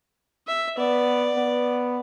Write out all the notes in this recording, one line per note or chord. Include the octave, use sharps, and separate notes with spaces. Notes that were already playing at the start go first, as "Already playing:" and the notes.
E5
B3 D5
B3